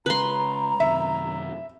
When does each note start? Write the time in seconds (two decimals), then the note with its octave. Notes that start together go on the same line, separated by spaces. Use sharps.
0.06 C#3 G#3 B4 A#5 C6
0.80 F#2 C3 D#3 E5